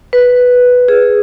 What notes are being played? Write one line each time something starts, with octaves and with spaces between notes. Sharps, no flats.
B4
G#4